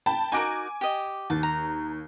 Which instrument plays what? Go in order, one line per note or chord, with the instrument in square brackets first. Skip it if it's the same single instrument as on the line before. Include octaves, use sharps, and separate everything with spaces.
[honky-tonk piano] G5 A5 B5
[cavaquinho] D#4 F#4 A#4 [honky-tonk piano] G#5 D6 D7
[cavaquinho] G4 D#5
[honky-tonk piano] D#2 [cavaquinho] A5
[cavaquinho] A#5